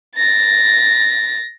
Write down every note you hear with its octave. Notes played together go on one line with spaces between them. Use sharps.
A6 A#6